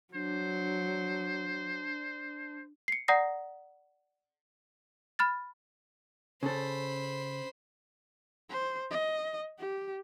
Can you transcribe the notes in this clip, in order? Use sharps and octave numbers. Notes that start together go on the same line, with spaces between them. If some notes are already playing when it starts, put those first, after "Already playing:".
F#3 D4 C5
C7 C#7
D5 F#5 A#5 D#6 A#6 C7
B5 F6 A6
C#3 A4 C5 B5
C5
D#5
G4